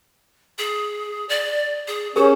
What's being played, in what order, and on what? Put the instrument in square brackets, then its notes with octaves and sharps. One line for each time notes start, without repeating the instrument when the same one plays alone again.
[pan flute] G#4
D5
G#4
[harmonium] C#4 [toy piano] G4 G#4 A#4 [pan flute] C5